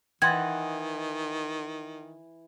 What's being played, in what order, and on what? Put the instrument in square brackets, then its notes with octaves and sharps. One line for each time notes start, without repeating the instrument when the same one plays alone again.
[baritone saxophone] D#3 [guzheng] E3 D#5 F#5 [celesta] G5 C6 A6 [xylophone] G#6